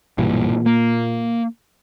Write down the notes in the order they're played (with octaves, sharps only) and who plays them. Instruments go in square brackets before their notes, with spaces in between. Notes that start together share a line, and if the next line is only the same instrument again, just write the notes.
[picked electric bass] B1 G2 E3 [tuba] A#2
[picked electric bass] A#3